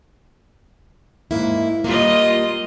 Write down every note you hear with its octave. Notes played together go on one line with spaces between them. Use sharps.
G#2 A#3 E4
G3 A#3 F4 D#5